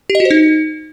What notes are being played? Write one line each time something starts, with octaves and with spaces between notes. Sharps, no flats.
G4
D#5
F#4
C5
D#4